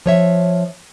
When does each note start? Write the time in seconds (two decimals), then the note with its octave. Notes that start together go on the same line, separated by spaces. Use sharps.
0.06 F3 C#5 E5